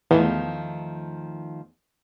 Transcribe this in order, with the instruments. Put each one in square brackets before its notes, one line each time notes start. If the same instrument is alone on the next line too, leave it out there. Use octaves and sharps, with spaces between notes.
[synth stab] E2 [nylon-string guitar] D#3 F3 A3